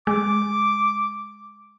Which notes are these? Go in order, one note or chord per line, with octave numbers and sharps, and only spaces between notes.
G#3 D6